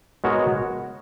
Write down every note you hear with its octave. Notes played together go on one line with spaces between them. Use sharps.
G#3 B3 F#4 A#4 C#5